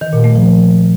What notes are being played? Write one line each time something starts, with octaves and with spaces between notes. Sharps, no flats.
D#3
A#2
A3
F3